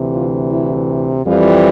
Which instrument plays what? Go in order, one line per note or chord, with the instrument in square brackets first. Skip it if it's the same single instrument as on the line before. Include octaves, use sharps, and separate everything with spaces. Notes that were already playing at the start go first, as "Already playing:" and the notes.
Already playing: [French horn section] D2 C3 E3
F4
E4
F2 E3 G3 F4